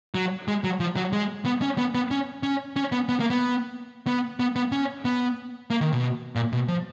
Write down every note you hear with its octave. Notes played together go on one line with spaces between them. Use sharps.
F#3
G#3
F#3
F3
F#3
G#3
B3
C#4
B3
B3
C#4
C#4
C#4
B3
B3
A#3
B3
B3
B3
B3
C#4
B3
A#3
D#3
B2
A#2
B2
F3